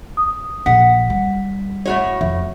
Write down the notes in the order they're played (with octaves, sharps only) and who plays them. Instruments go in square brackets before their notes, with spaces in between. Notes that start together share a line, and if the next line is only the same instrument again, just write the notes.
[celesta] D#6
[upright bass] A#1 [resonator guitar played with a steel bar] F#5 [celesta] B6
[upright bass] G3
[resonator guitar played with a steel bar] A2 F#4 C#5
[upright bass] F2 [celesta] E5